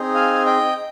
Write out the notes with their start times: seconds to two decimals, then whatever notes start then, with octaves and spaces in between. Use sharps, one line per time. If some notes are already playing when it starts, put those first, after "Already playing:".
Already playing: C4 D#4 G#4
0.14 F5 G#5
0.46 D#5 G5